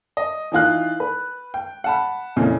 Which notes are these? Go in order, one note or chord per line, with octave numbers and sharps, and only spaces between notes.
D#5
E3 D#4 F4 F#6
B4
G5
F#5 A5 B5
F2 A#2 C#3 E3